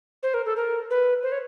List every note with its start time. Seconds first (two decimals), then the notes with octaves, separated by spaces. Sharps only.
0.23 C5
0.34 A#4
0.46 A4
0.56 A#4
0.90 B4
1.23 C5
1.32 C#5